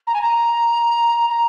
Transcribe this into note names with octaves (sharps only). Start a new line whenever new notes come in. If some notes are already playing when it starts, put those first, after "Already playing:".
A#5
G#5
A#5
A#5